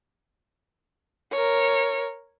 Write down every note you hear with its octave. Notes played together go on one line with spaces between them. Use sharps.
A#4 C#5